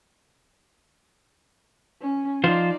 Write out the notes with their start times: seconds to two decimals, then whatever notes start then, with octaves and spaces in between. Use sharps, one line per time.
2.02 C#4
2.44 F3 D#4 F4 C5 D5